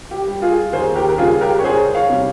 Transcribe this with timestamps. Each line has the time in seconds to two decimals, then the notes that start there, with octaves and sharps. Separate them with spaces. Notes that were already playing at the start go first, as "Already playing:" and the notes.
0.11 G4
0.27 G3
0.42 F4 G#4
0.73 D#2 G#4 C5
0.95 G4 A#4
1.09 A#4
1.18 C#3 G3 F4 G#4
1.41 G4 A#4
1.59 C#5
1.64 C2 G#4 C5
1.95 C#5 F5
2.10 C3 G3